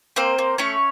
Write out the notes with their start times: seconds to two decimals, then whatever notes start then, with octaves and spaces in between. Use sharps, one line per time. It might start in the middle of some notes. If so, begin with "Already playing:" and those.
0.16 A#3 C4 C5
0.39 A#3
0.58 A3 C#4 C#5